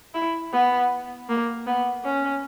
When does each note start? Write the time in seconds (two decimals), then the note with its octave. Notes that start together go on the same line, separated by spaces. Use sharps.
0.14 E4
0.53 B3
1.29 A#3
1.67 B3
2.05 C#4